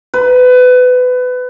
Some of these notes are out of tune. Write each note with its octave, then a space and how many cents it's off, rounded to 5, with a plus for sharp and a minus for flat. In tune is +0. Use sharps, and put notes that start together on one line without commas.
B4 +25